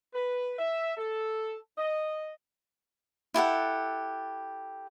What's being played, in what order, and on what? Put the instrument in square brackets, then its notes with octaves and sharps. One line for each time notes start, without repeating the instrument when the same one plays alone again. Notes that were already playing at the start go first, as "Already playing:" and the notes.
[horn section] B4
E5
A4
D#5
[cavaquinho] E4 G4 A4 F#5